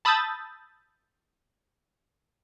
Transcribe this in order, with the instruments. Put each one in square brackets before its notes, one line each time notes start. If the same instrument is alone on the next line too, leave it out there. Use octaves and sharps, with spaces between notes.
[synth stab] A5 B5 D#6 E6 G6 A6